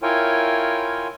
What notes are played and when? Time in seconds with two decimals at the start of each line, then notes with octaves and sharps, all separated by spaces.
0.03 E4 F4 A#4 C#5 G5 G#5